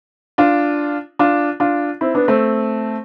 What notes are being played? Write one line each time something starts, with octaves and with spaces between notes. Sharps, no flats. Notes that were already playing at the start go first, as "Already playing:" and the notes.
D4 F4
D4 F4
D4 F4
C4 E4
B3 D4
A3 C4